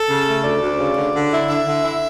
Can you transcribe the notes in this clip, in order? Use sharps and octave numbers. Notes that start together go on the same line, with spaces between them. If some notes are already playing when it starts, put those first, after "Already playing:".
Already playing: A4
C#3
A3
D2 D5
D2
C#3
D3
D3
E4
D3 E5
D3
E4